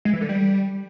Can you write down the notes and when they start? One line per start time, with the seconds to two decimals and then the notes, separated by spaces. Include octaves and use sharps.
0.05 G#3
0.13 E3
0.21 D3
0.29 G3